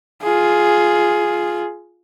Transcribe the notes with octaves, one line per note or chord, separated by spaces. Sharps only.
F4 G#4